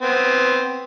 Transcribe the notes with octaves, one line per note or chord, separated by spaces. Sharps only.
B3 C4